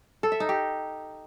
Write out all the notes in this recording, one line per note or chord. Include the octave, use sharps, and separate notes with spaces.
A4
E5
D#4
G4